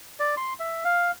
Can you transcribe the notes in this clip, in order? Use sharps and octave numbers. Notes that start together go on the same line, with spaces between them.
D5
C6
E5
F5